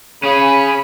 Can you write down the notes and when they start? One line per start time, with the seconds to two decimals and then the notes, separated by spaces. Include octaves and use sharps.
0.24 C#3 C#4 G#4 B5